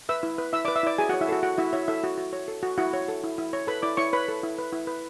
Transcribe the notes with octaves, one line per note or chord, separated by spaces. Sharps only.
B4 E5 E6
E4
B4
E4 E5 E6
B4 D5 D6
E5 E6
E4 D5 D6
F#4 G#4 G#5
F#4 C#5 F#5
E4 E5
F#4 A4 F#5
F#4 F#5
E4 F#4 E5
E4 C#5 E5
E4 A4 E5
F#4
F#4
C#5
A4
F#4
E4 F#4 F#5
C#5
A4
E4
E4
C#5
A4 B4 B5
E4 D5 D6
E4 C#5 C#6
B4 C#5 B5
A4
E4
B4
E4
B4